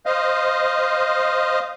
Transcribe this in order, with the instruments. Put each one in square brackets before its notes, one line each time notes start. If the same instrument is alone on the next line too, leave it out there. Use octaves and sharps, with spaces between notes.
[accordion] C5 D#5 F5